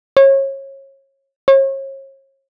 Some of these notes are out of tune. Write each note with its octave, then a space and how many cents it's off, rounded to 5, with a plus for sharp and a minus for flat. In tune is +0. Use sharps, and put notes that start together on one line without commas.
C#5 -30
C#5 -40